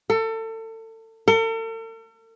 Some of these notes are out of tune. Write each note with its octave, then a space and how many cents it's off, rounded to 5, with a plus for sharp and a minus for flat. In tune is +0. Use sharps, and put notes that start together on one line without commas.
A4 +30
A4 +45